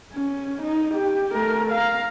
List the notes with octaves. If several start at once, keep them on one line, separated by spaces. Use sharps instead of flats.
C#4
D#4
G4
A3 A#4
F5 A#5